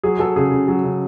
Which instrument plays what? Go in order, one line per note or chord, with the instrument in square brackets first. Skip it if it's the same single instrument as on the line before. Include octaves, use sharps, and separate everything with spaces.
[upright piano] F#3 G#4
F#3 A4
C#3 G#4
C#3
F#3
C#3